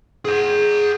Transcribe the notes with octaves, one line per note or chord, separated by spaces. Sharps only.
G#4 F#5